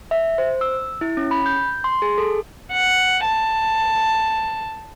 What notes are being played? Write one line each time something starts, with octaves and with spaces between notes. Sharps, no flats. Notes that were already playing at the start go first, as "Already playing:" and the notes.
E5
C5
E6
E4
C#4
B5
G6
C6
G#4
A4
F#5
A5